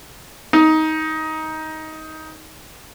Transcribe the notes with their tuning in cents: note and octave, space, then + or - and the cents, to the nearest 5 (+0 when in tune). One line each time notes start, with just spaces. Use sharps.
D#4 +15